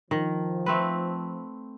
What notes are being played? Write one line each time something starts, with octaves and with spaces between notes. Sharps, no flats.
D#3 F3
A3 C4 B4